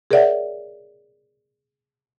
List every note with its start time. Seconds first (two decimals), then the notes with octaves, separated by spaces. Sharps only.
0.11 G#4 A#4 C#5 D5 E5 F#5